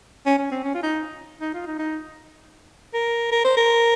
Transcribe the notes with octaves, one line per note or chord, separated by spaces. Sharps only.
C#4
C#4
C4
C#4
F4
D#4
D#4
F4
D#4
D#4
A#4
A#4
C5
A#4